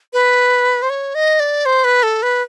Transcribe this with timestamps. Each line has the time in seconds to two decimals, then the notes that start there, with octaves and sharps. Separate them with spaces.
0.13 B4
0.82 C5
0.90 C#5
1.15 D#5
1.40 D5
1.65 C5
1.84 B4
2.03 A4
2.22 B4